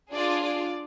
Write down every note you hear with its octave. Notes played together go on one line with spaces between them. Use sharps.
D4 F4 G#4 D5
D5